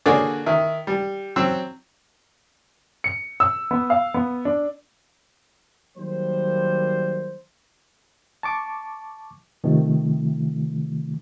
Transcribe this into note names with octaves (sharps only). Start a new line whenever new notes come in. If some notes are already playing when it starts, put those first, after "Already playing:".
D3 A#3 F#4 G#4 C#5 D5
D#3 E4
G3
F#3 C4 E6
C#7
E6
B3
F5
B3
D4
D#3 F#3 G3 A#3 C5
A5 C#6 D6
C3 D#3 F3 A3